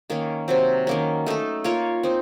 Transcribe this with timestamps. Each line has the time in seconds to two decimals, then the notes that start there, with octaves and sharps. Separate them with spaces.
0.10 D#3 A#3 C#4
0.48 C3 F#3 C4
0.87 D#3 A#3 C#4
1.26 A3 D#4 A4
1.64 A#3 F4 A#4 C#5
2.03 C4 D#4